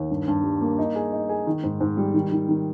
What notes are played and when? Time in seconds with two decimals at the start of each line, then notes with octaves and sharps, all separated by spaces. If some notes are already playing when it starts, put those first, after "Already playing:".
Already playing: D#2
0.11 G2
0.28 G2
0.43 G3
0.61 A#3
0.79 D#4
0.95 G#4
1.13 D#4
1.29 G#4
1.47 D#3
1.63 G#2
1.81 G#2
1.97 G3
2.14 D#3
2.32 D#3
2.49 D#3